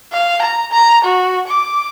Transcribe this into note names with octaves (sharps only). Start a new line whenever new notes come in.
F5
A#5
A#5
F#4
D6